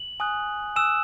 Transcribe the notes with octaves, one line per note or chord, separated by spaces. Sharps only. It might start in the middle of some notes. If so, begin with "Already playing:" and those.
Already playing: F#7
G#5 D#6 F#6
G#5 D#6 E6 F#6 E7